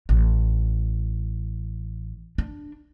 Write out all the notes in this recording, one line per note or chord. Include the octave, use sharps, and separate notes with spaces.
A1
D4